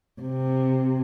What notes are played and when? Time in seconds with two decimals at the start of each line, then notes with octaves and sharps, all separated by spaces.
0.21 C3